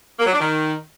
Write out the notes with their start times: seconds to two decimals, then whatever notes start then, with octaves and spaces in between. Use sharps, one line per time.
0.19 A#3
0.26 F#3
0.33 D4
0.40 D#3